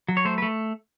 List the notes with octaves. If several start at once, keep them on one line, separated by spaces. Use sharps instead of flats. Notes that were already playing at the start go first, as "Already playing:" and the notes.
F#3
C#5
A3 C5
B4
A3